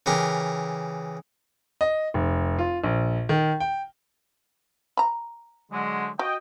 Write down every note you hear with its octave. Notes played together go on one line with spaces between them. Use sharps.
C#3 E3 G4 A#4
D#5
F1
F4
A#1
D#3
G5
A#5 B5
D3 F#3 G#3
F#4 D#5 G5